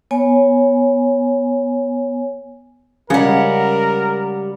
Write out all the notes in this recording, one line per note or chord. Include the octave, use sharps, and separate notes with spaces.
B3 C#5 G#5
C#3 G3 G#3 A#4 F#5